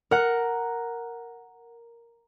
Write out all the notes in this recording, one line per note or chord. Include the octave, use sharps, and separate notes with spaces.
A#4 F#5